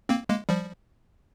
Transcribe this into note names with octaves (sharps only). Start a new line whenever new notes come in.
A#3 C4
G#3 A#3
F3 G3